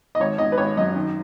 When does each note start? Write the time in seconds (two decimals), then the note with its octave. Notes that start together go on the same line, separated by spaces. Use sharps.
0.15 D#5
0.20 G#1 C#5
0.38 G#1 D#5
0.52 B4
0.58 G#1 C#5
0.77 F#2 D#5
0.96 D#3